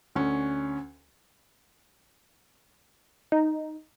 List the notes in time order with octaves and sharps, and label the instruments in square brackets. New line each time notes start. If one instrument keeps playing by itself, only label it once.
[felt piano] D2 C#4
[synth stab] D#4